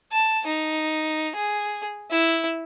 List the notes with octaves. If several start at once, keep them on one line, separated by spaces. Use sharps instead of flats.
A5
D#4
G#4
E4